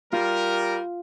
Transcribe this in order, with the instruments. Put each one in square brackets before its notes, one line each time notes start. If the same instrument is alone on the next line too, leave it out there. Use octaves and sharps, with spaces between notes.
[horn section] G3 A#4 [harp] F4